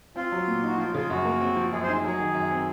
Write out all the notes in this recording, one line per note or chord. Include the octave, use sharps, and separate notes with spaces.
C4 F4
F#3
A#2
D#4 F#4
F3 F4
C#3 F4
F#2 F#4
A#3
C4
F3
F#2 G#4
G#4 C5
D#4
F#3 G#4
D#3
F#2
C4